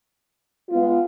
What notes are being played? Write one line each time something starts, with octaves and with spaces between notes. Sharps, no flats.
G#3 B3 F4